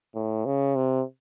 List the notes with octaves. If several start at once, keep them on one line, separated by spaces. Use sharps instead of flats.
A2
C#3
C3